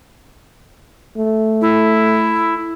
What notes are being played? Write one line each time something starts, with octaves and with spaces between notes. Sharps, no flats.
A3
E4